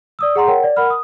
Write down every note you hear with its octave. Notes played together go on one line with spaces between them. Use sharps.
D5 D#6 E6
G#4 F#5 A#5 C6
A#4 C#5 F#5 G5
D5
A#4 F#5 B5 F6
D#6